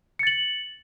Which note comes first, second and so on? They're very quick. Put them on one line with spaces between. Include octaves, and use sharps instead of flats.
C#7 A6 F#7